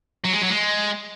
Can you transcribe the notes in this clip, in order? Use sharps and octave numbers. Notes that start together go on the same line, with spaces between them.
F#3
G#3
F#3
G#3